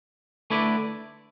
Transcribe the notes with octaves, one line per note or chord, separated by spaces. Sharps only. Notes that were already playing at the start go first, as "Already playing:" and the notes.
D3 A3 E4 B4 D5